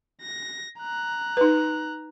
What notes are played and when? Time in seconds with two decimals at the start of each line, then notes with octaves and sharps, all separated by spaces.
0.22 A#6
0.80 A#5 F#6
1.37 D#4 B4